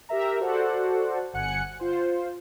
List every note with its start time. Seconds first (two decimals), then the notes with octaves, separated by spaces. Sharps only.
0.09 G4 A#4 E5 A#5
0.40 F#4 A4 C5 D5 F#5
1.33 G1 F#5 G#5 F#6 C#7
1.80 F4 C5